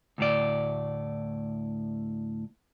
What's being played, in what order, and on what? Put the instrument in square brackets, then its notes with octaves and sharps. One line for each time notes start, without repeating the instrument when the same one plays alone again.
[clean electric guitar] D2 A2 D5